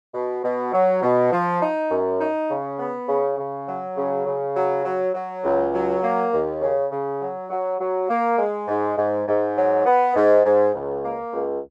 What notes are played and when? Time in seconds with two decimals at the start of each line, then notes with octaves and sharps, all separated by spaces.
0.14 B2
0.43 B2
0.73 F#3
1.03 B2
1.31 F3
1.61 D#4
1.91 F#2
2.20 D#4
2.50 C#3
2.79 B3
3.09 C#3
3.38 C#3
3.67 F#3
3.97 C#3
4.26 C#3
4.56 F#3
4.85 F#3
5.14 F#3
5.44 C#2
5.73 F#3
6.03 A#3
6.32 D#2
6.61 C#3
6.91 C#3
7.21 F#3
7.50 F#3
7.80 F#3
8.09 A#3
8.38 G#3
8.68 G#2
8.97 G#2
9.27 G#2
9.56 F#3
9.86 B3
10.16 G#2
10.45 G#2
10.75 C#2
11.04 A#3
11.33 C#2